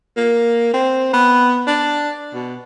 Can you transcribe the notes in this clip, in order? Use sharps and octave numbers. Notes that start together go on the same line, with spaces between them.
A#3
C4
B3
D4
B2